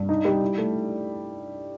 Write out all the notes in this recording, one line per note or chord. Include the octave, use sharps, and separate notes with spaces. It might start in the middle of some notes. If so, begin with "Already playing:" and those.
Already playing: G2
D#4
G3
E4
A3